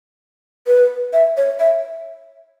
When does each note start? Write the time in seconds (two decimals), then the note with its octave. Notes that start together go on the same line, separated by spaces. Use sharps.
0.67 B4
1.13 E5
1.37 C#5
1.59 E5